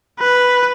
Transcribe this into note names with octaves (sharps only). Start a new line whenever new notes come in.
B4